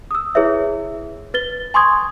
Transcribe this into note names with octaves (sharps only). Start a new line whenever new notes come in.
D#6 E6
E4 G#4 B4 C#5 E5
B4 A6 G7
G#5 C6 C#6 D#6 G#6